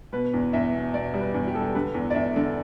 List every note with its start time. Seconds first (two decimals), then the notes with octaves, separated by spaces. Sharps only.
0.13 B2 B4
0.34 E2
0.53 E2 E5
0.73 B2
0.94 B2 D5
1.14 G3
1.21 B4
1.34 E2
1.47 G4
1.54 G3 A4
1.62 G4
1.75 D3 B4
1.94 E2
2.10 D5
2.15 E2 E5
2.36 D3